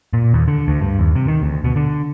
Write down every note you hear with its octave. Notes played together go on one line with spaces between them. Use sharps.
A#2
D#2
D3
D2
G2
D#2
C3
D#3
D2
B2
D3